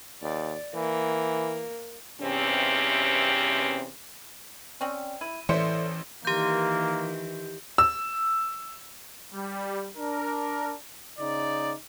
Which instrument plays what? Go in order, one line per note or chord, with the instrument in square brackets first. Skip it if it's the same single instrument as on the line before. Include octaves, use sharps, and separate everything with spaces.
[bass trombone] D#2 [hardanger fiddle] D5
[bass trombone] E3 [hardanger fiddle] A#3
[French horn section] E2 G2 C3 C4 C#4
[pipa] C4 C#4 [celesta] D5 G5
[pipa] E4 [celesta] D#7
[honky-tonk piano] A1 C5 C#7 [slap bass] E3 [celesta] A4 D5 C6 [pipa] E5
[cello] D#3 E3 [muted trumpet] A#3 [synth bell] G4 G6
[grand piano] E6
[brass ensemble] G3
D4 A#4
C#3 D#4 D5